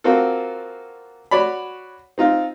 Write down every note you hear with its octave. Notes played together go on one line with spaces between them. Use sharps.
A#3 C4 F4 F#4 A4
F#4 C#5 D5 B5
C4 D#4 F4